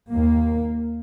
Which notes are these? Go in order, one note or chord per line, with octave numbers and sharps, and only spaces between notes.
D#2 A#3